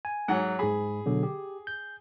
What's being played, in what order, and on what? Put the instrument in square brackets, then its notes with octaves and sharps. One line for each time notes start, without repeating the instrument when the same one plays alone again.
[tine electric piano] G#5
[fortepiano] G#2 F#3 F#5
[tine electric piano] G#2 B5 [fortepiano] G#4
[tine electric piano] B2 D3 F#3
G4
G6